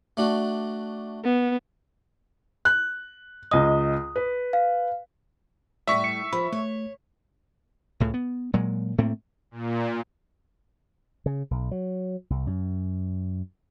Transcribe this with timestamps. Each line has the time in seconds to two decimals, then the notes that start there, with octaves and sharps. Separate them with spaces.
0.17 A3 D4 F#4
1.24 B3
2.65 F#6
3.51 C#2 D#5 D#6
4.16 B4
4.53 F5
5.87 A2 G3 D5 E5 C#6 B6
6.04 C#7
6.33 F3 B5
6.52 A3 C#5
8.00 C#2 A2 C#3
8.14 B3
8.54 A#2 F#3 G#3
8.98 A2 A3 A#3 C4
9.51 A#2
11.26 C#3
11.51 B1
11.71 F#3
12.30 C2
12.47 F#2